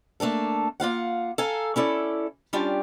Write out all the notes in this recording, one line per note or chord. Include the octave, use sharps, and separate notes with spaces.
A3 A#3 D4 A4
A#3 F4 F5 F#5
A4 F5 G#5 A#5
C#4 E4 A4 D5
G3 C#4 D4 F4 G4